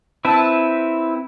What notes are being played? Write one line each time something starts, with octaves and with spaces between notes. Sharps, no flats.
C4 E4 B4 E5 A5